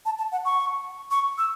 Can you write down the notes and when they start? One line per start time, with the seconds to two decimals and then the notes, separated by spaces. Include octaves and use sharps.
0.05 A5
0.18 A5
0.32 F#5
0.45 C#6
1.11 C#6
1.38 E6